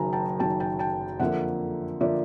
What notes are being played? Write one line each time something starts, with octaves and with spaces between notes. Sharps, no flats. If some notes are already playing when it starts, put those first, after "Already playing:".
Already playing: F#1 F#2 D#3 F#3 G#5 A#5
G5 A5
F#1 F#2 D#3 F#3 G5 A5
G5 A5
G5 A5
F2 D3 F3 A#3 E5 F#5
D3 F3 A#3 D5 E5